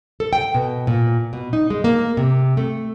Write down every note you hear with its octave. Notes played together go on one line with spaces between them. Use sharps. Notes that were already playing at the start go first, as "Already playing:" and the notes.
A4
G5
B2
A#2
B2
D#4
G#3
A#3
C3
A3